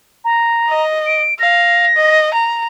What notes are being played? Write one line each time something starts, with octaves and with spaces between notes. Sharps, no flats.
A#5
D#5
D7
F5 A#6
D#5
A#5